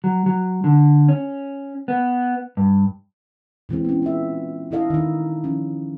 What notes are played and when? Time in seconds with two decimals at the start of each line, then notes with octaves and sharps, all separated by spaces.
0.04 F#3
0.26 F#3
0.64 D3
1.08 C#4
1.88 B3
2.57 G2
3.69 A#2 E3 G#3 C4
3.85 B3 C#4
4.02 C#4 F4 E5
4.71 A#2 D4 E4 A4 D#5 F5
4.90 D#3 D#4
5.44 F3 C#4